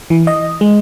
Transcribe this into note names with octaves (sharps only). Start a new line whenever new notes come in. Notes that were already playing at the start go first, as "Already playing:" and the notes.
E3
D#5
G#3